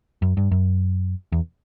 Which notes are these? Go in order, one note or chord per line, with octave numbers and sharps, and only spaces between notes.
F#2
G2
F#2
E2